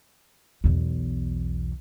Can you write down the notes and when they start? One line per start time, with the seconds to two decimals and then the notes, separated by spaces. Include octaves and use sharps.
0.64 B1 E2